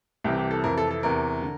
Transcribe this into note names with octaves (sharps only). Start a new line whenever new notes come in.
C2 C3 E3 G4
G4
A4
F2 C3 E3 A#4
A4
A4
E2 C3 E3 A#4
D3